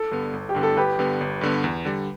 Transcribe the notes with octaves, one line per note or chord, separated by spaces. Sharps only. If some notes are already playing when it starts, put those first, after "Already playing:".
Already playing: A4
G2 D3 B3
G1
G4
G2 D3 B3
A4
G1 G4 B4
G2 D3 B3
G1
G2 D3 B3
E2
D3 G3